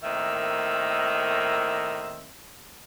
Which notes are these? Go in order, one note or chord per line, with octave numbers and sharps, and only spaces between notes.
A2 D#3 A#3 C4 D#5 E5